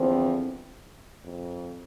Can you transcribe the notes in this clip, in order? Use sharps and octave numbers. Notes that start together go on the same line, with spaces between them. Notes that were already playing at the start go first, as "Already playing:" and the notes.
Already playing: E2 D3 F3 C4
F2